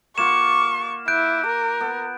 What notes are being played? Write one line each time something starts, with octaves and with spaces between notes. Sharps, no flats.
A#3 F4 F#5 C#6 E7
E4 F#6 G6 D7
A#4
B3